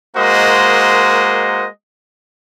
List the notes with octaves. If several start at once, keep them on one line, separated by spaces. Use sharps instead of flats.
G#3 A#3 F#4 A#4 C5 D#5